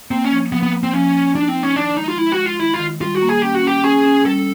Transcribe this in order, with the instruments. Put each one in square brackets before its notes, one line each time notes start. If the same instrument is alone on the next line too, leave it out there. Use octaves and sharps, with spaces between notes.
[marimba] A#3 [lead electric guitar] C4
[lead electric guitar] C#4
[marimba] F3
[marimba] F3 [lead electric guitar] B3
[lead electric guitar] B3
[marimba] A#3
[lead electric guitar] C4
[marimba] F3 [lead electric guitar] C#4
[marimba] F3
[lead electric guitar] D4 [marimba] D#4
[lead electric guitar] C4
[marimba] D#4
[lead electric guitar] C#4
[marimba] D#3 [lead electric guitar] D4
[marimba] G#3 [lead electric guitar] D#4
[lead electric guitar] F4
[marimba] G#3 [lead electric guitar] E4
[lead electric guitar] F#4
[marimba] G#3
[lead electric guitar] F4
[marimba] D#3 [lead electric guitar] E4
[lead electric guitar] F4
[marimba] D#3
[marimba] G3 [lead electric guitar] F4
[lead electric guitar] F#4
[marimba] A#3
[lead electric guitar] G#4
[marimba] C#4 [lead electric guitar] G4
[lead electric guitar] F#4
[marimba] C#4 [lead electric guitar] G4
[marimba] C#4 [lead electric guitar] G#4
[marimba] C#4
[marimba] G3 [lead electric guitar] A4